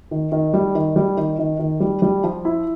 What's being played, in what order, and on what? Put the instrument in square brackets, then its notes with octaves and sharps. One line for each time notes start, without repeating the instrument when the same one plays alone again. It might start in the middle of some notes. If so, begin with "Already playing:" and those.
[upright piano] D#3
D#3
G3
D#3
G3
D#3
D#3
D#3
G3
G3
F3
E4